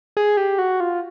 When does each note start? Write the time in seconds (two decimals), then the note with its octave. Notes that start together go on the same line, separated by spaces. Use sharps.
0.17 G#4
0.37 G4
0.58 F#4
0.80 F4